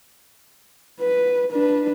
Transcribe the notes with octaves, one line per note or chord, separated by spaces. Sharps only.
B4
D4 B4